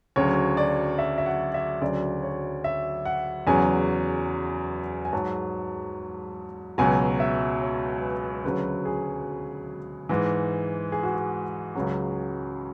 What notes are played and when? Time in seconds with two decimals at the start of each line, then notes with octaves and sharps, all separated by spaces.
0.16 D2 C#3 F#3 C#5
0.57 D5
0.98 E5
1.18 E5
1.26 F#5
1.54 E5
1.81 D2 C#3 F#3 D5
2.23 C#5
2.64 E5
3.05 F#5
3.47 E2 C#3 F#3 G#5
5.05 G#5
5.13 G#2 F#3 A5
6.78 C#2 B2 F#3 G#5
7.20 E5
7.61 C#5
8.02 B4
8.44 D2 C#3 F#3 B4
8.85 G#4
10.09 G#2 E3
10.92 G#4
11.03 F#4
11.14 G#4
11.75 C#2 C#3 F#3